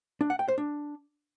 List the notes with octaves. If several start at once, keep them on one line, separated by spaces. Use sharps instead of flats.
D4
F#5
G5
C5
D4